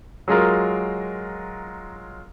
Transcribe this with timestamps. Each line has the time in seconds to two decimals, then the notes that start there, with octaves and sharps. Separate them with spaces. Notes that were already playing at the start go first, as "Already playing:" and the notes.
0.28 F#3 G#3 F4 A#4